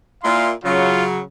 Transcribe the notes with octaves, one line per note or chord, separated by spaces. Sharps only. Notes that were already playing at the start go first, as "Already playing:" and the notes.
A#2 E4 F5 C6
C#3 F#3 F4